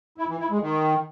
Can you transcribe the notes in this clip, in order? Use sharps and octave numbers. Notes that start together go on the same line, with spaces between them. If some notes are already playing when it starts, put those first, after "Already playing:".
E4
E3
E4
G#3
D#3